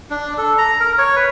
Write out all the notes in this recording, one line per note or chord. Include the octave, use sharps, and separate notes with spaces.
D4
A4
A#5
A#4
C#5
B4